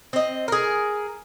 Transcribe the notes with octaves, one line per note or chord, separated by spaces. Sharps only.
C4 D#5
G#4 A#4